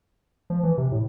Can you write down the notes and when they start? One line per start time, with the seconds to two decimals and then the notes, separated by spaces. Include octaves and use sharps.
0.50 F3
0.63 E3
0.78 C3
0.92 A2